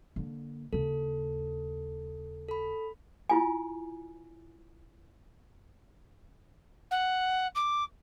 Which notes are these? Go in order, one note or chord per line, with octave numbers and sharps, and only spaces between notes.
D3 A#3
D#2 C#3 A4
A4 B5
E4 F4 G#5
F#5
D6